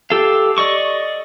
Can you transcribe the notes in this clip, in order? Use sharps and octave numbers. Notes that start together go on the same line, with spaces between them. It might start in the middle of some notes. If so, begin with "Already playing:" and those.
G4 A4 F5
D5 D#5 C#6 D6